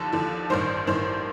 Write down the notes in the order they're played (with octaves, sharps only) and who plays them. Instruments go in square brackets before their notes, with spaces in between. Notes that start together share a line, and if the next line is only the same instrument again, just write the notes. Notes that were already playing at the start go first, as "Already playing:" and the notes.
Already playing: [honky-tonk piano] D#2 D3 F3 A4
D#2 D3 F3
A1 G2 D#3 C5
A1 G2 D#3 C5